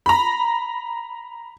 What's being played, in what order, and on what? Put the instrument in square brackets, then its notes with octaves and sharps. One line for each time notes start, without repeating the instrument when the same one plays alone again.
[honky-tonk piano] A#5 B5